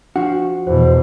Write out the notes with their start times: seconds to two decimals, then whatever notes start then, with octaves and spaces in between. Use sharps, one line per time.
0.16 F3 D4 F#4
0.67 E2 B2 C5